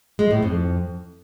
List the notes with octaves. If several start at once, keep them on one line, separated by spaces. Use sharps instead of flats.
G#3
A2
F2